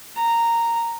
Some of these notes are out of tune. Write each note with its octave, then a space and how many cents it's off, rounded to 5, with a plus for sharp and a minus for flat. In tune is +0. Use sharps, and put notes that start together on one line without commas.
A#5 -10